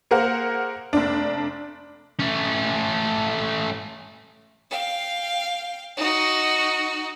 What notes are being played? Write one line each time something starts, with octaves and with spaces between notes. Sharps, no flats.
A#3 G#4 A#4 C5 F#5
F1 D4
A3 C#4
F5 G5
D#4 F#4